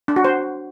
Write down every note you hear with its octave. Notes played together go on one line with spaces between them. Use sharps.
D4
F#4
C5